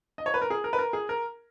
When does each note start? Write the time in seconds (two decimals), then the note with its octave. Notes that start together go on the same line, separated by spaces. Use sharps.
0.18 D#5
0.26 C#5
0.34 B4
0.42 A#4
0.50 G#4
0.64 A#4
0.73 B4
0.79 A#4
0.93 G#4
1.09 A#4